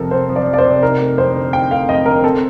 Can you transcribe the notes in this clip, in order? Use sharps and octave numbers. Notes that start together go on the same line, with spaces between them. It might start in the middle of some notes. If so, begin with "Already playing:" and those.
Already playing: F2 C3 F3 C4 A4 A#4
C4 C5
F3
D5
F2
D5
C5
C3
D#4 A#4
A3
F2 C5
D3
D#4 G5
A3 F5
F2 D#5
D3 A#4
C4 A4